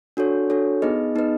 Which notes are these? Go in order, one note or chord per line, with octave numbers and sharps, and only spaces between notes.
D4 F#4 A4 C#5
D4 F#4 A4 C#5
B3 D#4 G#4 B4 D#5
B3 D#4 G#4 B4 D#5